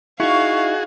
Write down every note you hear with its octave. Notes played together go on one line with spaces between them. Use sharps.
D#4 E4 F#4 G#4 F5 C#6